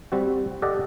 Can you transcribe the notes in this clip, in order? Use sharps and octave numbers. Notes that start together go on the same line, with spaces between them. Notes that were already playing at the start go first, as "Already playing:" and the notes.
G3 C4 F#4
G4 A4 D5 D#5 F#5